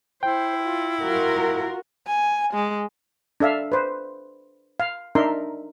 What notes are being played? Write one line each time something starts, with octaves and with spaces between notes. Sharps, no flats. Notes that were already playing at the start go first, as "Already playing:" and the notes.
E4 C5 G5
F4
F4 F#4 A#4
G#5
G#3
D4 A4 E5 F5
B4 C5
F5
D4 D#4 A#4 E5 C6